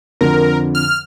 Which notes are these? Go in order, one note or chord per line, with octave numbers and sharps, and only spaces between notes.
F2 D3 F3 A#4
F6